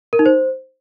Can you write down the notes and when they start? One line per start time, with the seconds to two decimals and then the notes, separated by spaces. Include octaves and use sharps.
0.13 A#4
0.19 D#4
0.26 C5